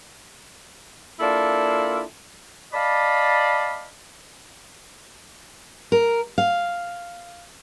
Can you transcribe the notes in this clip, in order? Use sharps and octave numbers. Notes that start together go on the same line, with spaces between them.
A#3 D4 E4 F4 A4
D5 D#5 F5 A5 B5
A#4
F5